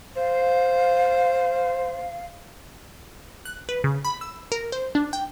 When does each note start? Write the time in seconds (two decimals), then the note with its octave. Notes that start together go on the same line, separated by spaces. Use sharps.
0.17 C5 F5
3.45 F#6
3.69 B4
3.84 C#3
4.05 B5
4.21 E6
4.52 A#4
4.72 C5
4.95 D4
5.13 G5